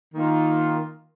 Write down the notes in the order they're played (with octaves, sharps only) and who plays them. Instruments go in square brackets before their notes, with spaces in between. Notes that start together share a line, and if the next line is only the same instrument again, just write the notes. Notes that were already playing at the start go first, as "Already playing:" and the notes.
[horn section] D#3 A#3 F4